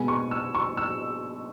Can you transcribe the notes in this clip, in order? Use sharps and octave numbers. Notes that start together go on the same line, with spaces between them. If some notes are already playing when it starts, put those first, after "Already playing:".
Already playing: B2 G#3 B3 G#5
C#6
E6
C#6
E6